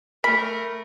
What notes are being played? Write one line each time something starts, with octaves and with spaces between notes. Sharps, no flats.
A3 A#4 B5 B6